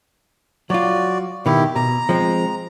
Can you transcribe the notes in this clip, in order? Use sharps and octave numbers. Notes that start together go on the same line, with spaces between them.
F#3 F4 F#4 D5
B2 D#3 E4 G4
B2 A#5
F3 G#3 C4